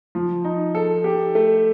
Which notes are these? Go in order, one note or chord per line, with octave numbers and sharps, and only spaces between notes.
F3
D#4
A4
G4
A3